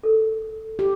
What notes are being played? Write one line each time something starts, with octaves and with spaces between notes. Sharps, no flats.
A4 A#4
G4